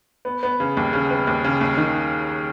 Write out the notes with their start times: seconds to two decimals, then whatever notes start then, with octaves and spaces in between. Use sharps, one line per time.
0.25 B3
0.43 B3
0.60 C#3
0.77 D#2
0.93 C#3
1.11 B3
1.27 D#2
1.44 C#3
1.61 D#2
1.77 D#3